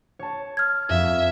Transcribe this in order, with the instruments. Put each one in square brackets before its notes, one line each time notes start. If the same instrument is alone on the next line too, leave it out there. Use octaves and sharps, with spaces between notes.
[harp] C#5 A5
[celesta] F6 G#6
[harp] F2 [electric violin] E5